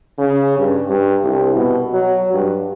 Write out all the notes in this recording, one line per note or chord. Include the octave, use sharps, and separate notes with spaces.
C#3
G2
G2
C2
B2
F#3
G2